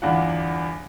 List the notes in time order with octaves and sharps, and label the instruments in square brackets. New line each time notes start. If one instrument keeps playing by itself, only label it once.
[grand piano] G1 E2 D4 F4 F#5